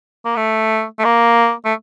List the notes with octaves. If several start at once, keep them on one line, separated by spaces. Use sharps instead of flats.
A#3
A3
A3
A#3
A3